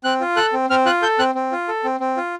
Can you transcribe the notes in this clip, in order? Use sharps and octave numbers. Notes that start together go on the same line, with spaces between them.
C4 F#6
F4
A4 F#6
C4
C4 F6
F4 F#6
A4 G6
C4 F#6
C4
F4
A4
C4
C4
F4